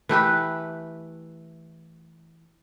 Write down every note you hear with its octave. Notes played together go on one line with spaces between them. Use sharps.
E3 A3 G4 B4